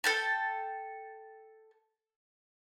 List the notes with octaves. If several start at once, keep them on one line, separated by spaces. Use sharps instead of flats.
A4 G5 A5